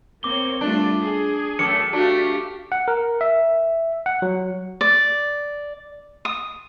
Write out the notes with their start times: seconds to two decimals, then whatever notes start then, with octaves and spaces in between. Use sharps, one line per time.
0.23 A#3 C4 C#5 D6 G7
0.61 G3 A3 D4 F4
1.00 G#4
1.59 F#2 A3 D6 C#7
1.93 A3 D4 F#4 G4 F5
2.72 F#5
2.88 A#4
3.21 E5
4.06 F#5
4.22 F#3
4.81 D5
6.25 D#6